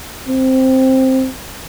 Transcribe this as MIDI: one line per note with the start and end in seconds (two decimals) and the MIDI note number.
0.28 1.29 60